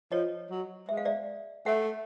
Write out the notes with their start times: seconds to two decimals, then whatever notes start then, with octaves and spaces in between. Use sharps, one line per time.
0.12 F3 C#5 D#5
0.50 F#3
0.89 G#3 E5
0.97 F5
1.05 D5 E5
1.66 A3 E5 F#5